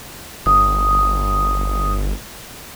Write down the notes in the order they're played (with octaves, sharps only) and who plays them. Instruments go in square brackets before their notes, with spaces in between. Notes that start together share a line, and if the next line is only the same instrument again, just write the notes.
[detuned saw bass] G1 [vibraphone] D#6